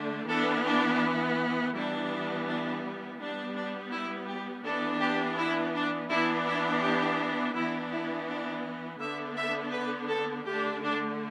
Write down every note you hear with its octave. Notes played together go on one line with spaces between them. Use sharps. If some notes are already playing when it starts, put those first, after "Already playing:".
Already playing: D3 A3 D4
E3 B3 D4 A4
D4
E3 G3 B3 D4 E4
D4
G3 B3 D4
D4
E4
G4
E3 B3 D4 A4
G4
E4
D4
E3 B3 D4 E4
E4
G4
E3 B3 D4 E4
E4
D4
D3 B3 D4 E5
E5
B4
A4
D3 A3 D4 G4
D4